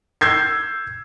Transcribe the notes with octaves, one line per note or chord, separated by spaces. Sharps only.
E6 G6 G#6 C7